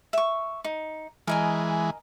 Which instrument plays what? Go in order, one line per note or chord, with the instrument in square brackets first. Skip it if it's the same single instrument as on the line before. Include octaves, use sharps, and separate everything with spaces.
[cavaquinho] E5 C#6
D#4
[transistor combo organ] E3 G#3 [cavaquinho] A#4 D#5 G#5